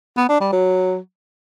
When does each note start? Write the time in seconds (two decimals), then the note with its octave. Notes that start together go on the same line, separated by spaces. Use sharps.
0.17 B3
0.29 D4
0.41 G3
0.52 F#3